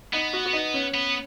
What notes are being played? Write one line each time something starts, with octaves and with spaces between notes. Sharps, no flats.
B3 D#4
F#4
F#4
D#4
C#4
B3